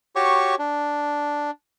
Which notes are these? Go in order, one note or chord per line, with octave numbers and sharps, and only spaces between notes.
F#4 G4 C#5 C#6
D4